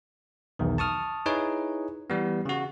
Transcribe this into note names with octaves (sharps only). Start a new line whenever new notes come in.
B1 E2 D#3
A5 C#6 D#6 F6
D#4 E4 G#4 B4 C#5
E3 G3 B3
C#3 F#4